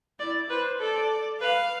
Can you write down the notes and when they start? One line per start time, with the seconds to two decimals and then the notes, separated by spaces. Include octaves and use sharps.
0.19 E4 D5
0.50 B4 C5
0.80 A4 D5
1.41 B4 F5